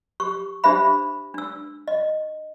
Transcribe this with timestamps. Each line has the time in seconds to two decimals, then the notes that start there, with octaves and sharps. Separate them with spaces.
0.20 G4 C#6
0.64 D4 G4 C5 E5 B5
1.34 D4 E6
1.88 D#5